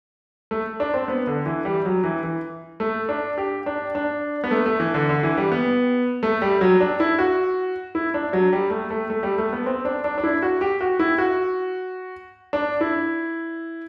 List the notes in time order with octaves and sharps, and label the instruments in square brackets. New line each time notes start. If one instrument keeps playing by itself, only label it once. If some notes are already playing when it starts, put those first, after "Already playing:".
[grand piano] A3
D4
C4
B3
D3
E3
G3
F#3
E3
E3
A3
D4
G4
D4
D4
B3
A3
A3
E3
D3
D3
E3
G3
B3
A3
G3
F#3
D4
E4
F#4
E4
D4
F#3
G3
A3
A3
A3
G3
A3
B3
C4
D4
D4
D4
E4
F#4
G4
F#4
E4
F#4
D4
E4